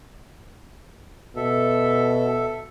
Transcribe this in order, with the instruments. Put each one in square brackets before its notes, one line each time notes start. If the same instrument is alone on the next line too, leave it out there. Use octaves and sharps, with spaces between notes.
[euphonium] B2 [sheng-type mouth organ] A4 E5